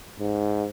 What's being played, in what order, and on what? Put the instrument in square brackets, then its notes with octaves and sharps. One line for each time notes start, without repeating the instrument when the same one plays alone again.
[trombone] G#2